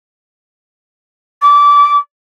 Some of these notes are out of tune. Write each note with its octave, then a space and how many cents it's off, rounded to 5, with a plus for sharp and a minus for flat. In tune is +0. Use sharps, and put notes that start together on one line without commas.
D6 -20